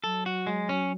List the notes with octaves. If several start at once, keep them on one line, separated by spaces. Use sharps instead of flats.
F#3 A4
F#4
G#3
C#4